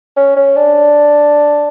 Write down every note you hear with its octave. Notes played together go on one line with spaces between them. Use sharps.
C#4
C#4
D4